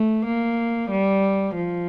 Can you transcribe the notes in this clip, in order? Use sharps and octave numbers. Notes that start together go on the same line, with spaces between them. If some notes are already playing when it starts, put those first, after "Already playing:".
Already playing: A3
A#3
G3
F3